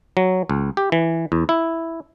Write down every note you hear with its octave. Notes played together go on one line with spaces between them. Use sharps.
F#3
C#2
G4
E3
E2
E4